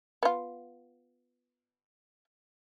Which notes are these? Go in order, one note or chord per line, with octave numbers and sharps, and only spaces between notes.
B3 F4